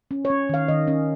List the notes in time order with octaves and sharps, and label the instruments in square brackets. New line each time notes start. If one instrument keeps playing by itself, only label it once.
[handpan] C#4
C#5
C#4
D#3 F5
D#3 D#5
C#4